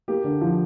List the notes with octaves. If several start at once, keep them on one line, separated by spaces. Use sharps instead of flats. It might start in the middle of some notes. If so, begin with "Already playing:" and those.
A#3 G4
D3
F3